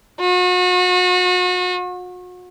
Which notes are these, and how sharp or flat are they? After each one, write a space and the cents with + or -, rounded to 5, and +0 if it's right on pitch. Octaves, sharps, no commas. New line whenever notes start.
F#4 -40